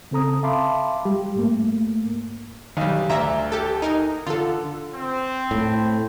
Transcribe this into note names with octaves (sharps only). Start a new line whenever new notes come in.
C#3 C4 A4 A#5 D#6
E5 F5 A5 B5 C6 D6
G3 G4
G#2 A3 A#3
B1 D#3 G3
D2 D5 E5 A#5
G4 A4
D#4 A#4
D3 F4 A4
C4
A2